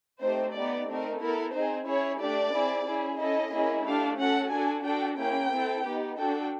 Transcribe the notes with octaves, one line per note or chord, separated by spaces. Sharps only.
A3 C4 D#4 G4 C5
B3 D#4 G4 D5
A3 C4 D#4 A#4
B3 E4 A4 A#4
C4 D#4 G#4 C5
C#4 E4 G#4 C#5
A3 D4 G4 D5
C4 E4 G#4
C#4 E4 G#4
C#4 E4 A4 D#5
A#3 C#4 E4 G#4
A3 D4 G4 F5
C#4 F#4 A4 F#5
D4 F#4 A4 G#5
D4 F#4 A4 G5
A#3 C#4 E4 G#4 G5
C4 E4 A4
B3 D#4 G4
D4 F#4 A4 G5